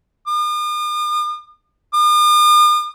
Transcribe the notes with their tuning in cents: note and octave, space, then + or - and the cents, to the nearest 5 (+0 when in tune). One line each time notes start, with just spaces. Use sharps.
D#6 -45
D#6 -45